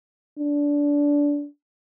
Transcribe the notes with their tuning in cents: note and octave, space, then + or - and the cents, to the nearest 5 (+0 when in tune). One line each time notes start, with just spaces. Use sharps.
D4 -20